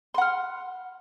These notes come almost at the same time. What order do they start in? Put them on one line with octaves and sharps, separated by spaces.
C6 F#5 F6